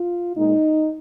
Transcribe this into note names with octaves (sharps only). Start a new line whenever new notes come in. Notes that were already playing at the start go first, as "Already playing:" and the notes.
Already playing: F4
A#2 G#3 D#4